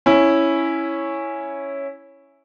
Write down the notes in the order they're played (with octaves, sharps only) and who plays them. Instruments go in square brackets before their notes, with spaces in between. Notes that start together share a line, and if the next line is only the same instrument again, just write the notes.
[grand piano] C#4 E4